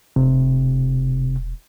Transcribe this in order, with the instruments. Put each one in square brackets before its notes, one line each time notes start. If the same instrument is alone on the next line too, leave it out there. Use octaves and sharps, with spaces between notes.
[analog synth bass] E1 [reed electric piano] C3